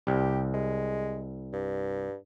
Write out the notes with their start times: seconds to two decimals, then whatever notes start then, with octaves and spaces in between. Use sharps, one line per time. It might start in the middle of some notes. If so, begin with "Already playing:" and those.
0.07 C2 G4
0.54 G#3
1.53 G2